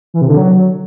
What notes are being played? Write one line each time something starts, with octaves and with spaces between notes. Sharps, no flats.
E3
C3
D3
F#3